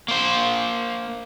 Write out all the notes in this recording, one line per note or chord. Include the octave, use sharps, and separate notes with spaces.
A#3 C5